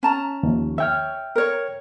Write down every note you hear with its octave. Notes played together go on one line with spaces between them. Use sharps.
C#4 A5 A#5
D#2 F3
C#5 E5 G5 F6
A#4 C#5